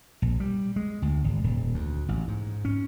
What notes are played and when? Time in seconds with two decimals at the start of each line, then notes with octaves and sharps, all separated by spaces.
0.22 A#1
0.40 G3
0.76 G#3
1.02 D2
1.24 G#1
1.44 D#1
1.74 D2
2.09 A1
2.28 G#2
2.65 C#4